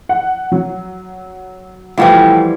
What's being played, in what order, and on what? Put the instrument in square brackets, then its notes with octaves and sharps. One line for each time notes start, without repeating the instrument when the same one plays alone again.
[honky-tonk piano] F#5
F#3
[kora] E3 F3 G3 [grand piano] A3 E4 F4 [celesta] F#5 G5